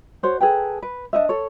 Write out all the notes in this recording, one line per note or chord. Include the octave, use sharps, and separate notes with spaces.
F#4 C5 C#5
G#4 A4 B4 G5
B4
D4 D#4 D#5 E5
A4 C#5